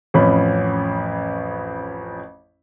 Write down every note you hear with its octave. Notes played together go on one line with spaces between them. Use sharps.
A1 F2 C#4 B5